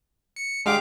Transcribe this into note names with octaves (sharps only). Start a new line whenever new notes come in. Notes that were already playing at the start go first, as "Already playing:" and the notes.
C#7
G#3 D4 G4 F5 G5 D6